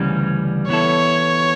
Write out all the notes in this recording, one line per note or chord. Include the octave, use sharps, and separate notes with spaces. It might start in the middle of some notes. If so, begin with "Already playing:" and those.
Already playing: D2 C#3 E3 G3 C#4
E3 B3 E4 A4 C#5